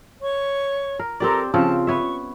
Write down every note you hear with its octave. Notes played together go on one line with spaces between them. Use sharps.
C#5 C#6
A#4
C4 G4 A4 A#4 D5 A#5
C#3 F3 C4 A5
B3 C#5 E5 C#6